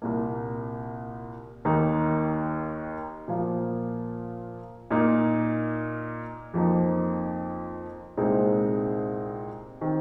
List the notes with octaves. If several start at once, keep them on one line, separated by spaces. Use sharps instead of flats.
C2 A#2 A#3
D#2 D#3 A#3 D#4
A#2 F3 A#3 F4
A#2 A#3 D#4
F2 F3 A#3 D#4
C2 A#2 G#3 C4 D#4
D#3 C4